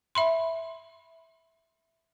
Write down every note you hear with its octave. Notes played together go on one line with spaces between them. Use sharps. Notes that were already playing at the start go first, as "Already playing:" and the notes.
E5 B5 C6